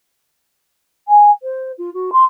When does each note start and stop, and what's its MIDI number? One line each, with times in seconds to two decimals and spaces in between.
1.08 1.30 80
1.43 1.72 72
1.78 1.92 65
1.94 2.10 66
2.12 2.24 84